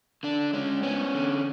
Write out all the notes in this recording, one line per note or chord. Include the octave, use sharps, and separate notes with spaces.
D3 D4
G#3 C#4
B3 C#4
D3